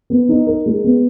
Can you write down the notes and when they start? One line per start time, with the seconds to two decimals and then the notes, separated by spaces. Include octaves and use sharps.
0.10 B3
0.29 D#4
0.47 A#4
0.66 G#3
0.84 B3